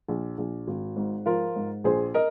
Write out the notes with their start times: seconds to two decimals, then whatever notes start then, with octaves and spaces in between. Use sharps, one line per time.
0.08 A#1
0.38 A#1
0.67 G#1
0.96 G#2
1.26 F3 F4 A#4
1.56 G#2
1.84 A#1 G#4 C5
2.14 A#4 D#5